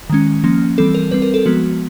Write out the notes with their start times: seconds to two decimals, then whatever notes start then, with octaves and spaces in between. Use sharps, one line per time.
0.10 D#3 G#3 C#4
0.44 F3 A#3 C#4
0.78 E3 G3 C4 A4
0.95 A#4
1.11 G3 C4 B4
1.22 A#4
1.34 A4
1.46 F3 G#3 B3 F#4